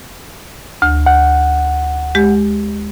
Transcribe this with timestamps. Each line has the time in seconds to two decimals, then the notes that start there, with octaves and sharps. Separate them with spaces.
0.82 D2
1.06 F#5
2.15 G#3 G4